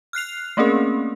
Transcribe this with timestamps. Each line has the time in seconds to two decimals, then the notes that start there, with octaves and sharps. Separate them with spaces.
0.13 F6 F#6 C7 F7
0.57 A3 A#3 C4 C#4 G#4 A#4